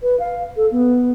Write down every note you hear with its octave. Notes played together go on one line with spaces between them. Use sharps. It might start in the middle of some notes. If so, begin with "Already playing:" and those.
B4
F5
A4
B3